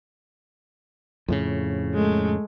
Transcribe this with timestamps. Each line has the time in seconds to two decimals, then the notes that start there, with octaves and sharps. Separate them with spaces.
1.28 F2 A2 C#3
1.94 G#3 A3